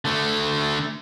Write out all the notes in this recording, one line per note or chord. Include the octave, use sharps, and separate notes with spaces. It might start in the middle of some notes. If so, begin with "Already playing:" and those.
D3 A3